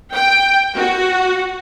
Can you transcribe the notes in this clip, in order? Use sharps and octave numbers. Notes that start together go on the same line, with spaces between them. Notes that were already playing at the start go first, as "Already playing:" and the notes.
G5
F#4